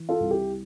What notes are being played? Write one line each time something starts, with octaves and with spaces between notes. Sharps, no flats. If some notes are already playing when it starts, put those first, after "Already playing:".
Already playing: E3
F4 A4
C2
E4 G4